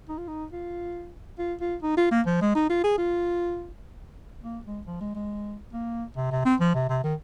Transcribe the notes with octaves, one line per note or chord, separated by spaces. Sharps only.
D#4
F4
D#4
F4
F4
F4
D#4
F4
A#3
F3
G#3
D#4
F4
G#4
F4
A#3
G#3
F3
G#3
G#3
A#3
C3
C3
C4
F3
C3
C3
D#3